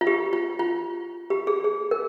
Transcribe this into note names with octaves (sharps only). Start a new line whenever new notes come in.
F4
G4
F4
F4
G4
G#4
G#4
A#4